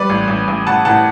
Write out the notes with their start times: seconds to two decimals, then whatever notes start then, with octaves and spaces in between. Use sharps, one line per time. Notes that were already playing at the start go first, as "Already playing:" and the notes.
Already playing: G3 B4 D5
0.10 A1
0.28 A1
0.48 A1
0.67 A1 F#5 A5
0.85 A2 F#5 A5